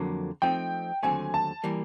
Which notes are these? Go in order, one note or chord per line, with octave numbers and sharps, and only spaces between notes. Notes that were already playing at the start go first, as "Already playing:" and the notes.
Already playing: F2 D3 F#3 A#3
F3 A3 C4 D#4 G5
D#2 D3 F#3 A3 C4 G#5
A5
E3 G3 A#3